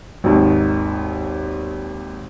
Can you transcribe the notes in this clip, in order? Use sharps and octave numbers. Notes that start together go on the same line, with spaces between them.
G#1 D#2 D#3